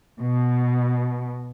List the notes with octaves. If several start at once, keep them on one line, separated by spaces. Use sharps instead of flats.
B2